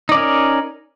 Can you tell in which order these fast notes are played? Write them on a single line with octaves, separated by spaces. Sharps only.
D#4 D5 C#4 A#4